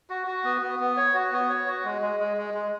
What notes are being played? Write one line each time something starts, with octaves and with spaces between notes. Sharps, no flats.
F#4
F#4
B3
B3
B3
C#5
F#4
B3
C#5
F#4
G#3
G#3
G#3
G#3
G#3